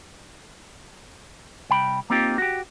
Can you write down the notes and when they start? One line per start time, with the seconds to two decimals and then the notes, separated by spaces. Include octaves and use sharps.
1.70 C2 G5 B5
2.10 A#3 C4 D#4 F4 G4
2.38 F#4 G4